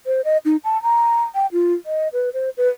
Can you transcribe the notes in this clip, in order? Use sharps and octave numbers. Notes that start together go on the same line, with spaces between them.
C5
D#5
D#4
A5
A#5
G5
F4
D#5
B4
C5
B4